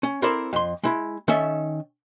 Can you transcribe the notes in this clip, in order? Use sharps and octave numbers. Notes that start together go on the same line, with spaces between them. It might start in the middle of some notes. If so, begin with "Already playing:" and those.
C#4
C4 E4 A4 A#4 C5 D5
F2 C6
G#3 E4
D#3 C#4 A4 E5